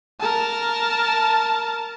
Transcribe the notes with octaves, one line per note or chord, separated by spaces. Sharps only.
A#4 A5